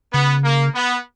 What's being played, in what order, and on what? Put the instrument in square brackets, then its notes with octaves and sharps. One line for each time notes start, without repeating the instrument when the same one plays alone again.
[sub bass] C#3 [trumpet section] B3
[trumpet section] A#3
B3